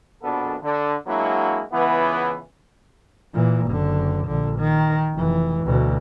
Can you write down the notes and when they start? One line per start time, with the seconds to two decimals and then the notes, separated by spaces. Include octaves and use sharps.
0.23 A#1 F2 B2 B3 D4 A4
0.62 D3
1.06 F#3 G#3 A#3 D4 E4 F#4
1.72 C#2 E3 B3
3.34 A#2 E3
3.66 F#1 D3
4.27 A#1 D3
4.59 D#3
5.15 F1 E3
5.64 D2 B2